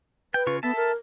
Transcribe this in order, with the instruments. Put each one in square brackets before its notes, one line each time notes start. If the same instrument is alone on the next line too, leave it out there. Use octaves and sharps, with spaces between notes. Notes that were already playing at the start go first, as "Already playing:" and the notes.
[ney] B4 [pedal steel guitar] G5
[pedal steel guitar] C#3 F4 C#6
[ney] B3 [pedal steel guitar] A4 E5 A5
[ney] A#4